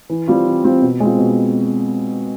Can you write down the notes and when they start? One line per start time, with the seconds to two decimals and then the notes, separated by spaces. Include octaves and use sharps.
0.10 E3
0.28 G3 C4 F4
0.45 E3
0.64 G3 C4 F4
0.82 B2
1.00 G#3 C4 F4
1.19 B2